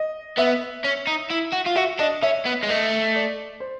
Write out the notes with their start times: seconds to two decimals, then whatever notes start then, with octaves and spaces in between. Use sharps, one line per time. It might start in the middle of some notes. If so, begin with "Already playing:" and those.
Already playing: D#5
0.37 B3 E5
0.84 C#4
1.07 D#4
1.31 E4
1.53 F#4
1.67 F4
1.76 F#4 E5
1.99 D4 D#5
2.22 C#4 E5
2.45 B3
2.63 G#3
2.69 A3 D#5
3.15 D5
3.60 C5